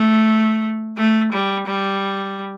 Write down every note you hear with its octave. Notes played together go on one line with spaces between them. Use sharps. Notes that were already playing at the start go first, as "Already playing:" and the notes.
Already playing: A3
A3
G3
G3